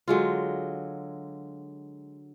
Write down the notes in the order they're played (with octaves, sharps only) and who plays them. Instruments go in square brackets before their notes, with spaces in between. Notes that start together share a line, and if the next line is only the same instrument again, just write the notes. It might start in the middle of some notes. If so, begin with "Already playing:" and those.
[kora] D3 F#3 G#3 F4